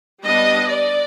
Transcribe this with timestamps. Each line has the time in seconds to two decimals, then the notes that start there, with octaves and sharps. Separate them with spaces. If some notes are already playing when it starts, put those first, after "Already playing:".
0.23 G3 B3 D4 D#5
0.69 D5